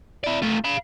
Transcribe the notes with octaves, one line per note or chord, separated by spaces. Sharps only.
E4 D5
A3 F4
F5 B5